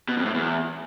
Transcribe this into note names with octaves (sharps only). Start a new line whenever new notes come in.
B2
F2
A2
E2